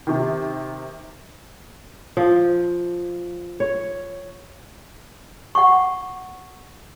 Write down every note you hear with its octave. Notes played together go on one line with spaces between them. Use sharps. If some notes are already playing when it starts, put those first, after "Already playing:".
C3 D#3
F3
C#5
F#5 C#6